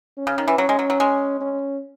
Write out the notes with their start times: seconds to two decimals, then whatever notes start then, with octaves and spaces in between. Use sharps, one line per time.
0.17 C#4
0.27 C#3
0.38 D#3
0.48 E3
0.58 F#3 C#4
0.69 G#3
0.79 F#3
0.90 F#3
1.00 G#3
1.41 C#4